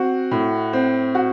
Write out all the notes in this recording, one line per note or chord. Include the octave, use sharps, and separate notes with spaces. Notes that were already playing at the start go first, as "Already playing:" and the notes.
Already playing: C4 F#4
A2
C4
F#4